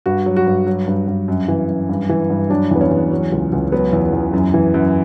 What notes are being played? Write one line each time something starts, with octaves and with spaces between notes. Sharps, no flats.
G2 F#4
F#3
F#4
G2
F#3
G2
G2
F#2
E3
F#2
G2
E3
G2
F#3 D4
E2 B3
C#4
E2
F#3
C#2
C#2
F#3 B3
E2
E2
F#2
E3
F#2